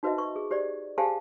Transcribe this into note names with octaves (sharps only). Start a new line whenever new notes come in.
D#4 F#4 B4 C5 D#5 E5
B4 C#6
G#4
G4 C5 D5
G4 G#4 C5 F5 G#5 A5